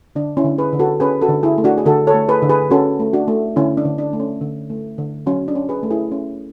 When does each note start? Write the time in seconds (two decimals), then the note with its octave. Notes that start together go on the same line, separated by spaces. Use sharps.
0.15 D3 D4
0.37 C#4 E4
0.44 D3
0.58 G#4 B4
0.73 D3
0.79 F#4 A4
1.00 C#4 G#4 B4
1.21 F#4 A4
1.29 D3
1.43 E4 G#4
1.58 A3
1.64 D4 F#4
1.78 G#4
1.85 D3 F#4 A4
2.07 A4 C#5
2.14 A3
2.29 G#4 B4
2.42 D3
2.50 G#4 B4
2.70 C#4 F#4 A4
2.99 A3
3.13 D4 F#4
3.28 A3
3.56 D3 C#4 E4
3.77 D4
3.85 D3
3.98 D4
4.13 A3
4.20 C#4
4.41 D3
4.70 A3
4.98 D3
5.26 F#3 C#4
5.48 D4
5.55 C#4
5.69 G#4 B4
5.83 A3
5.91 E4 G#4
6.12 C#4